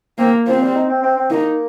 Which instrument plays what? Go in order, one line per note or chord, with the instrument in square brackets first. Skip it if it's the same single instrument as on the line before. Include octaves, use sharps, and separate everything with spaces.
[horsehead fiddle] A#3 [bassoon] C4
[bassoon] F3 [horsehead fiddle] C4
[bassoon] G3
D#4
C4
C4
C4
[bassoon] A#3 [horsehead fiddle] D#4